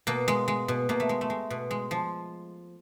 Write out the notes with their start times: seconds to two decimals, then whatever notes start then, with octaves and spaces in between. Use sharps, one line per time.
0.07 B2 A#3
0.28 G#3
0.48 G#3
0.68 B2
0.89 B2 A#3
1.00 A3
1.09 G#3
1.21 A3
1.30 G#3
1.50 B2
1.71 G#3
1.91 F3